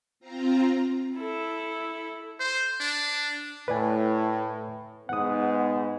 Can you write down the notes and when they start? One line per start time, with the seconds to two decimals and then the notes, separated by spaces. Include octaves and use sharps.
0.20 C4 F4 A#5
1.17 E4 A4
2.40 C5
2.80 D4
3.68 A2 B4 D5 G#5
5.09 G#2 B3 F#5 D#6